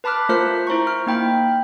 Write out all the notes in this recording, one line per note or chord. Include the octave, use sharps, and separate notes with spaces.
B4 A5 B5 D6 F6 F#6
A3 F4 A#4 C5 F6 B6
E4 C5 A#5 C#6
F6
A#3 D#4 G5 B5 F6